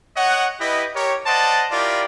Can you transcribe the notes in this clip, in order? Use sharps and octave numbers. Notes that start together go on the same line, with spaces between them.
C#5 D#5 F#5
E4 G4 B4 D#5
G4 A#4 C#5
C5 D5 D#5 F#5 A5
E4 F4 G4 A#4 D5